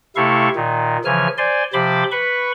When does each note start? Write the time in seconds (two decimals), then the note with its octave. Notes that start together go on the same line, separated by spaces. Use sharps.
0.16 C3 A3 E4 A4 F5 C#6
0.56 A#2 D#3
1.05 C#3 E3 F3 G#5 F6
1.38 C5 D5 G#5 C6
1.73 C3 F3 C5 B5 C6 D6
2.11 B4 B5 C#6